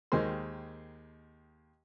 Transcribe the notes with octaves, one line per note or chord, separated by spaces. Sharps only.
D#2 D#3 G#3 A#4 C5 C6